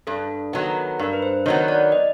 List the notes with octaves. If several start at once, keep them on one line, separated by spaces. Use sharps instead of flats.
G2 A4
D#3 F#3 B3
G2 A#4
B4
C5
D#3 F#3 B3 C#5
D5
D#5